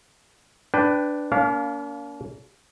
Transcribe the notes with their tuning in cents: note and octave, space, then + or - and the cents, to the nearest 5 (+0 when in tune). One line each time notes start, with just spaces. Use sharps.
D4 +0 B4 +15 G5 +0
A#3 +5 D4 -45 F5 +0